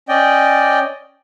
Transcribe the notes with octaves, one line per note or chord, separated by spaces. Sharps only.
C#4 D5 D#5 G5